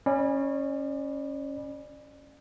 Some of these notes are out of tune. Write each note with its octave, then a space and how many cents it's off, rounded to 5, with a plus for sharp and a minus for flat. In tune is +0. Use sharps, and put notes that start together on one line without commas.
C#4 -10 D5 +35 B5 -20